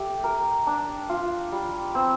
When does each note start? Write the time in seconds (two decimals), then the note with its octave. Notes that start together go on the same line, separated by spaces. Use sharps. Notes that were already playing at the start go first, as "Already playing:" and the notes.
Already playing: A3 G4
0.24 A#4
0.67 D4
1.09 F4
1.52 G3
1.95 C4